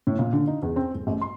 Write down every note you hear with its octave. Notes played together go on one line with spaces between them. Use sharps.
A2
A#2
D3
D#4
E2
C4
D#1
A1
C6